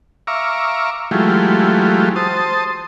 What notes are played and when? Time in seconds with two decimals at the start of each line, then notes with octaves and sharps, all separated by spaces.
0.27 E5 F5 A#5 C#6 D6
1.11 E3 F#3 G#3 A3 F4 G4
2.16 C5 A5 D#6